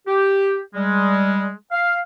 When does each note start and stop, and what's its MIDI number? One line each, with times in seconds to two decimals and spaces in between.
0.07 0.58 67
0.75 1.51 55
0.75 1.51 56
1.72 1.99 77